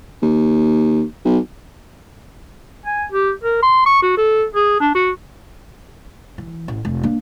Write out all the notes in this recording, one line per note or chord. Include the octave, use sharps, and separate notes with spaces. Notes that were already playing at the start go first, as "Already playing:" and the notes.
D#2
B1
G#5
G4
A#4
C6
C#6
F#4
A4
G#4
D4
F#4
E3
A1
F1
A#3 D4